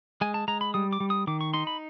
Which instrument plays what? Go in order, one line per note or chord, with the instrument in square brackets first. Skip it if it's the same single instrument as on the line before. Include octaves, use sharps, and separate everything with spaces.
[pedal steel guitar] G#3 G#5
A5
G#3 A#5
B5
G3 D#6
D6
G3
D#6
D#3 D6
C#6
D#4 C6
B5